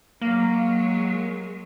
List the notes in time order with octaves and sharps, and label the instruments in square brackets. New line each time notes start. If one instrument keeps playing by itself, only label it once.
[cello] F#3 G#3 [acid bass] A#3